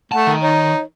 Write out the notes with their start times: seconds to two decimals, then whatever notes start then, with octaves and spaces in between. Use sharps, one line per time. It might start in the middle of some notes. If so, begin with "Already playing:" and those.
0.12 A3 F#5 A5
0.27 D#3
0.42 D#4 C#5